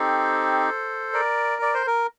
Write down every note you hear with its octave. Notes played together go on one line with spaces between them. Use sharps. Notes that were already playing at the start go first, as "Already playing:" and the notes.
Already playing: C4 D#4 G4 A4 C5
A#4 D5
D5
C5
A#4